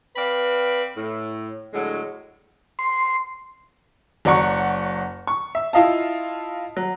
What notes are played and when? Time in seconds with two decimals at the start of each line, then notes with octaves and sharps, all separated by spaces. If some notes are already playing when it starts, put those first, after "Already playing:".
0.16 C4 B4 D5 F5 B5
0.96 A2
1.73 A2 D3 F#3 G#3
2.79 C6
4.25 F#1 F#3 D5 F#5 C#6 C#7
5.27 C#6
5.55 E5
5.73 E4 F4 D#5 F5 A5
6.77 F#3